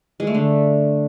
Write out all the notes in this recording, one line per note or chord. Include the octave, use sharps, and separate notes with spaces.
G#3
A3
D3